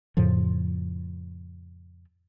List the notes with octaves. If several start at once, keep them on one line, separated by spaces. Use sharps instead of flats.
F2 A2 C#3 F3